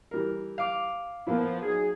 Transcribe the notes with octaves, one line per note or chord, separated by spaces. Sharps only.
E3 G3 A#4
F5 D6
F3 A#3 B3 E4
F#3 D#4 G#4